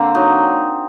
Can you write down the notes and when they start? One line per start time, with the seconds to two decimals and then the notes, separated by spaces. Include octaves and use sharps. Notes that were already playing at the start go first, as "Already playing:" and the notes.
Already playing: D3 A#3 C4
0.15 F#3 D#4